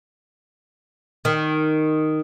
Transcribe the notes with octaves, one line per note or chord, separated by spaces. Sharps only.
D#3